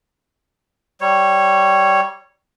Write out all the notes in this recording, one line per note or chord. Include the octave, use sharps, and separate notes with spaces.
G3 C#5